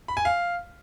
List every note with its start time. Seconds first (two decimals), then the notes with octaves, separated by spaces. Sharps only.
0.08 B5
0.17 G#5
0.25 F5